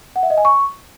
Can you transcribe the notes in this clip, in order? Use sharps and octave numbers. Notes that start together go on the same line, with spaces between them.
F#5
E5
D#5
G#5
C#6